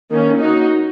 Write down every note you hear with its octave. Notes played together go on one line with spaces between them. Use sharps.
D#3 A#3 C#4
D#4 F#4